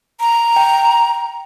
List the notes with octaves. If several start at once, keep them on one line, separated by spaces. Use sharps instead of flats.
A#5
G5